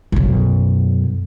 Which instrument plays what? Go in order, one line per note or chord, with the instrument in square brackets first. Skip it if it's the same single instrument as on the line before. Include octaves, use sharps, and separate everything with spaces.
[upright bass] B1 F#2